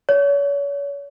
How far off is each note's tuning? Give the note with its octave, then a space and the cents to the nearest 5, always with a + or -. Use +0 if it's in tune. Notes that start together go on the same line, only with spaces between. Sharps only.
C#5 +35